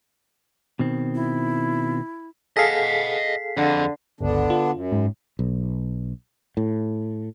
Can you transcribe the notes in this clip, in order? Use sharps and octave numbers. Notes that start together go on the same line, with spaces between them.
B2 D#3 C4
E4
G#4 A4 D#5 F5 F#5 B6 C7
F2 D3
G1 C#2 D3 B3 D4
F4
F#2
G#2
B1
A2